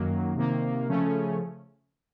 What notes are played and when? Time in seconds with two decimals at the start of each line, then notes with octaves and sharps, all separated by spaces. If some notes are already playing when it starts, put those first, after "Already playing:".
Already playing: F#2 D#3 F#3 A#3
0.35 C3 D#3 A#3
0.88 C#3 F3 A3 C#4